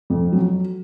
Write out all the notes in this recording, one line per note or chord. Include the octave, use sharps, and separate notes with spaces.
F2
F#3